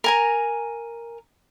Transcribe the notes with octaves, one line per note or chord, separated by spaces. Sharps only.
A#4 G#5 A#5